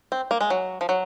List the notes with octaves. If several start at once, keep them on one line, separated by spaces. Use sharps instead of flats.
C4
A#3
G#3
F#3
F3
F#3